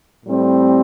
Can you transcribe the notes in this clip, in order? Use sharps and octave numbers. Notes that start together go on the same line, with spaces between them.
A2 G3 C4